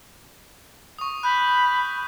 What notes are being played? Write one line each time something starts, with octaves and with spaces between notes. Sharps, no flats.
C#6 D#6
B5 F#6 G6